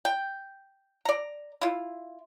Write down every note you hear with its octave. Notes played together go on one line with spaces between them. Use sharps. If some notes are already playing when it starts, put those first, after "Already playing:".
G5
D5 A#5
E4 F4